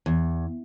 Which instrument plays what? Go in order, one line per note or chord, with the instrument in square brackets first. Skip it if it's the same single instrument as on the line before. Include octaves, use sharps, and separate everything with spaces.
[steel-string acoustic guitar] E2